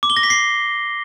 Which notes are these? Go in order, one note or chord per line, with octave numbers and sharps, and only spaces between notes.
D6
G7
A#6
B6
C7